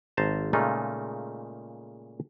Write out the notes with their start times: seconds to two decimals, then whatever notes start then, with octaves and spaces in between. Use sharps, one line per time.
0.17 G#1 C5 A5 A#5
0.53 A#2 C#3 G#3 A3 D#4 F4